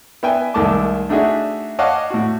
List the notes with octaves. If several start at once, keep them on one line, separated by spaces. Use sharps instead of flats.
B3 E5 G5 G#5
C2 D#3 G#3 A3 A5 D6
A3 D4 D#4 F#4 G#4 E5
C#5 D#5 F5 F#5 A5 D6
A2 F#4